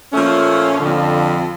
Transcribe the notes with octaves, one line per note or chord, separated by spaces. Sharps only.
A#2 F3 A3 C#4
F2 D3 F3